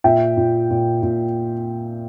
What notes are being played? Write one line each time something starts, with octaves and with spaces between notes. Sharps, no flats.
A#2 E5 G5
A#2
A#2
A#2